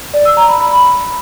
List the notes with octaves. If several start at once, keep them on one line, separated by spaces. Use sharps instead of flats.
D5
E6
A#5
B5
B5